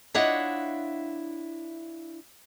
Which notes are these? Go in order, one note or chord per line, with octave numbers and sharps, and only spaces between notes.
D4 E4 F4 C#5 D#5 F#5